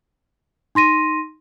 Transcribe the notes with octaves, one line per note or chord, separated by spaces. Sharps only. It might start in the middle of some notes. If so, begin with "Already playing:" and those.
D#4 C6 A#6 D#7